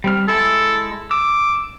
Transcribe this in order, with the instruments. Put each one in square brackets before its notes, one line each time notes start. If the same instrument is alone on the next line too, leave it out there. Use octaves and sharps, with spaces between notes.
[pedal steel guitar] G3 C4 F6
[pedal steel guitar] G#3 E4 [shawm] A4
[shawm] D6 [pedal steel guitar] E6